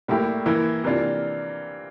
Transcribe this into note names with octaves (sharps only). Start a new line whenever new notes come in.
A2 G3 A#3 E4 G4
E3 A#3 E4
C3 E3 A#3 D4 F4